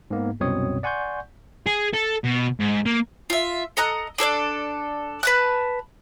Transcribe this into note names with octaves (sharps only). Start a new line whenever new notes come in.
G#2 A#3 B3
C2 F#2 B2 C4 C#5 D#6
D5 F#5 G#5 C6 C#6 G6
G#4
A4
B2
G#2
A#3
F4 E5
A4 D#5 A#5 F#6
D4 A4 C#5 D5
B4 A5 F#6